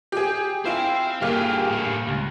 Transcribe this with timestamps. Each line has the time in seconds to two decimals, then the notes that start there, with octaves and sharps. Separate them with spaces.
0.12 G4 G#4
0.66 E4 C5 F5 G5 E7
1.22 G2 A#3 G4 G#4 F6
1.70 A2 G#4
2.08 C#2